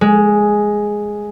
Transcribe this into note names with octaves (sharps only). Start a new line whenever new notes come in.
G#3